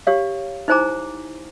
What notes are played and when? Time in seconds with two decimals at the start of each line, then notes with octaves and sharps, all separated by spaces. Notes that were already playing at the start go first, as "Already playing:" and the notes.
0.07 G4 C#5 F5
0.68 D#4 E4 C5 G#5 A#5 D6